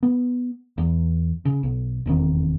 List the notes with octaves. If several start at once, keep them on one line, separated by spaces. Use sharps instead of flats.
B3
E2
C#3
B1
F1 E2 D#3 C4